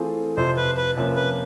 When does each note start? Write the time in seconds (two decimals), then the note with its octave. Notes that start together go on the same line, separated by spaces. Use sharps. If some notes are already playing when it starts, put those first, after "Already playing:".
Already playing: E3 A3 C4 F4 G#4
0.37 F2 C3 F3 C5
0.57 B4
0.77 B4
0.97 C3 F3 A#3 C#4
1.16 B4